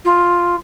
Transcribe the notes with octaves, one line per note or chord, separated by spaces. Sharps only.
F4